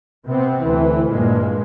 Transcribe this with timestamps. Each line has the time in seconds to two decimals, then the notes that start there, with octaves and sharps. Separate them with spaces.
0.25 C3 B3 C4
0.63 D2 E3
1.08 G2 A#2 G#3